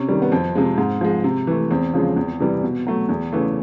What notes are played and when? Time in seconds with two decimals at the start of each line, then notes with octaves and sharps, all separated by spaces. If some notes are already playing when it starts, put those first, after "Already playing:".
Already playing: C3 C#4
0.09 D#3 G3
0.22 B3
0.32 F2 C4
0.55 C3 F3 G#3
0.78 G#2
1.01 F3 G#3
1.24 C3
1.47 E3 A3
1.71 E2 C4
1.94 C#3 F3 G#3
2.16 E2
2.40 C3 E3 G3
2.63 B2
2.87 F#3 A3
3.09 E2
3.33 C#3 E3 A3